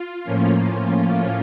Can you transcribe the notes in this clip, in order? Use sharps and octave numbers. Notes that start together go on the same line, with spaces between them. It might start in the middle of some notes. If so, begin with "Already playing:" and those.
Already playing: F4
A2 F3 A#3 C#4